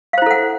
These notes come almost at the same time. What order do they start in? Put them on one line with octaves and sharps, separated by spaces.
F5 C5 E4 A4 F#5